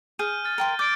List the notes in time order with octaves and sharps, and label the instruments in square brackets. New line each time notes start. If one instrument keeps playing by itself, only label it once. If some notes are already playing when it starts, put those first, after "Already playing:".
[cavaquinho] G#4 [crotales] F6 G6 D#7
[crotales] F6 A6 D#7
[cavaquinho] A#4 G5 C6
[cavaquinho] D6 [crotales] G6 A6 D7